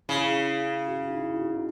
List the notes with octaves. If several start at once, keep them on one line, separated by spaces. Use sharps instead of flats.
C#3 E4
F#4
D#4
E4
F#4
D#4